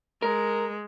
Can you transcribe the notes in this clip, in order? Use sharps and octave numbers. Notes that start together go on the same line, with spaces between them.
G#3 A#4